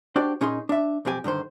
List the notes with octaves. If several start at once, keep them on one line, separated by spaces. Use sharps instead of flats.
D4 F#4 G4 C5 D5
A#2 C#4 D#4 G#4 D#5 C6
D4 E5
B1 F2 C4 G4 G#5
G2 D3 D#3 C5